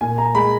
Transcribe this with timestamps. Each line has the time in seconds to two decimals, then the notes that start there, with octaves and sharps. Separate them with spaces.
0.01 A#2 G#5
0.18 A#5
0.34 G#3 B5